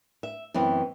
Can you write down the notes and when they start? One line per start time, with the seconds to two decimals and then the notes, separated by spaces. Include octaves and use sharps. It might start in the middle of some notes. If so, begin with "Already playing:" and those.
0.23 E5
0.54 F#2 E3 B3 C4